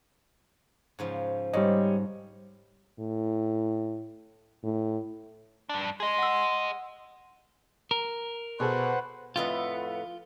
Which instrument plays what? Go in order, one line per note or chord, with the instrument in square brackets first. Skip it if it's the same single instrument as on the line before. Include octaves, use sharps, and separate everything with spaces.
[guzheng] G#2 C#3 F3
[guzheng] G#2 [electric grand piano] G3 C#5 D#5
[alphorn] A2
A2
[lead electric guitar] G2 D4
[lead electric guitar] G#4 D#5 [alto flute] C6
[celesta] F#5 E6
[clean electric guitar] A#4
[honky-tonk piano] B2 G#4 A4 [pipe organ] B4 C5 F#5
[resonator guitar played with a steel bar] F2 A2 D#5 [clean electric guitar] F4 [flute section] B4 F#5